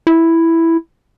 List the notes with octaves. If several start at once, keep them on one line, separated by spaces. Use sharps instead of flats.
E4